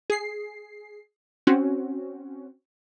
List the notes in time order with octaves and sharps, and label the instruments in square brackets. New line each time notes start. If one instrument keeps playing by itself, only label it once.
[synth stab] G#4 C7
C4 C#4 F#4